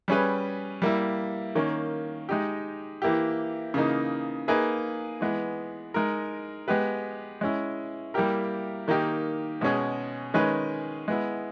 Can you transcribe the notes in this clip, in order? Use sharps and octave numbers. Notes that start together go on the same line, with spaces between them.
G3 C#4 G#4 B4
G3 A#3 E4
D#3 A#3 C#4
G#3 D#4 G4
E3 A#3 E4 G4
C#3 E3 A#3 D#4
A#3 D#4 G#4 B4
E3 G#3 B3
G#3 D#4 A#4
G#3 B3 G4 B4
G#3 C#4 E4
G3 A#3 E4 G4 A#4
D#3 A#3 D#4 G4
B2 G#3 C#4 G#4
D#3 G#3 C#4 G#4 B4
G#3 B3 E4